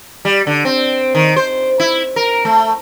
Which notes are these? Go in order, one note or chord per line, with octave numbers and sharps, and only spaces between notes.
G3
D3
C4
D#3
C5
E4
A#4
A3